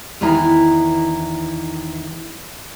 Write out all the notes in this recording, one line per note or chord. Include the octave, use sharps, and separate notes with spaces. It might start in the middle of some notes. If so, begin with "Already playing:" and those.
E2 D#3 E3 E4 A#5